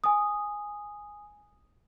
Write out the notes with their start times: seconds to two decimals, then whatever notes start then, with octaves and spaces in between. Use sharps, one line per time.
0.04 G#5 D#6